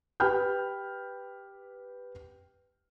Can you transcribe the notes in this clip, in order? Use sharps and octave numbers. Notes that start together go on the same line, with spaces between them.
G4 B4 G5 B5 F6 G6